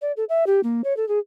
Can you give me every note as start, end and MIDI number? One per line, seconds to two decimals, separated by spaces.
0.02 0.12 74
0.17 0.24 69
0.29 0.44 76
0.47 0.60 67
0.63 0.82 58
0.84 0.96 73
0.97 1.07 69
1.08 1.19 68